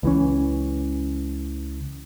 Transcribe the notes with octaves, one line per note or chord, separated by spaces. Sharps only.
C#2 E3 C#4